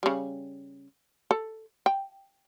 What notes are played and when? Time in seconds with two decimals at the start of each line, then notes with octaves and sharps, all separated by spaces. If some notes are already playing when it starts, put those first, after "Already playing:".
0.03 C#3 G3
1.31 A4
1.86 G5